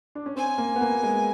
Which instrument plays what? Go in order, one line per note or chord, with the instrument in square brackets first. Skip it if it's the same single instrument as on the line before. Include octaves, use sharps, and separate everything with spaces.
[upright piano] D4
C#4
[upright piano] C4 [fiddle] G#5
[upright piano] A#3
B3
A#3
G#3